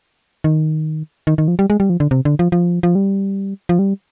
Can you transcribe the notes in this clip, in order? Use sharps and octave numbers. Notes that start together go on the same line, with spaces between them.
D#3
D#3
D#3
F3
G3
G#3
G3
F3
D3
C3
D3
F3
F3
F3
G3
F3
G3